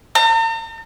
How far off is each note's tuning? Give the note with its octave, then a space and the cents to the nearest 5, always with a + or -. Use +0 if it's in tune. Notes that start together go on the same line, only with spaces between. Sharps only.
A#5 -45